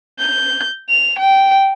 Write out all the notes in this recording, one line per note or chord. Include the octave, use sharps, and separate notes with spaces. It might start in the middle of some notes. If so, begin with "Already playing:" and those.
G6
F7
G5